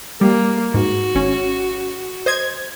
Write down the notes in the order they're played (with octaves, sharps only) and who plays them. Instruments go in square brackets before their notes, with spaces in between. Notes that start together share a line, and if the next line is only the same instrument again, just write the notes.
[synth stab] G3 [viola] A#3
[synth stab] G#2 [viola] F#4
[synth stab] G#1 C#4
C5 D#5 G#6